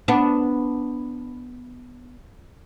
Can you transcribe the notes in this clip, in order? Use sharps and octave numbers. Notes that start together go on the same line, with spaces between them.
B3 D4